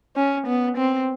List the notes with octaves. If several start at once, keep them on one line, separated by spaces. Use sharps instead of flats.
C#4
B3
C4